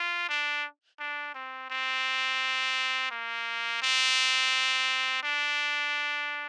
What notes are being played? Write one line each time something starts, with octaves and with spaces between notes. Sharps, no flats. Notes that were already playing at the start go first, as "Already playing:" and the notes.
Already playing: F4
D4
D4
C4
C4
A#3
C4
D4